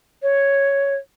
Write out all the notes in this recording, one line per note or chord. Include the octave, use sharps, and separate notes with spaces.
C#5